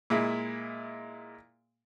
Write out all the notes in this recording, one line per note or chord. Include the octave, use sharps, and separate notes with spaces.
A#2 G#3 E4